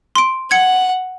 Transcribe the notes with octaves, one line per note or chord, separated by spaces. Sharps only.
C6 D7
F#5 G#6 C#7